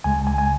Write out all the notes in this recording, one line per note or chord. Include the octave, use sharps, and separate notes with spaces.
C#2 C#3 G#3 G#5
G#5
G#5